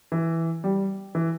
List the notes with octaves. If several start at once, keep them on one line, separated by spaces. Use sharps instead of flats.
E3
G3
E3